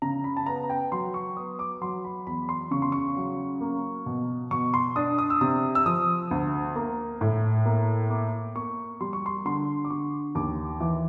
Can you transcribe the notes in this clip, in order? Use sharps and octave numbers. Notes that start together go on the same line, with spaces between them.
C#3 A#5
B5
A5
B3 A#5
G5
F#3 C6
C#6
B3 D#6
D6
F#3 C6
B5
E2 B5
C6
C#3 C#6
C6
C#6
F#3
A#3
B2
B2 C#6
C6
D4 D#6
D#6
E6
C3 D#6
E6
F3 D#6
D2
A#3
A2
A#3
A#3 D6
A#3 C#6
G3 C6
C#6
C6
D3 C6
D6
D3 C#6
D#2 D6
E3 D6